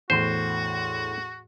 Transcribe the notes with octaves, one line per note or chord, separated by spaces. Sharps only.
E2 A2 F#4 C5 C6